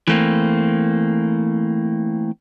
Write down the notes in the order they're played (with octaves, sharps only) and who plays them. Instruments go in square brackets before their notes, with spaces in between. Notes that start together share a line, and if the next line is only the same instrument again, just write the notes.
[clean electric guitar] E3 A3 A#3 C4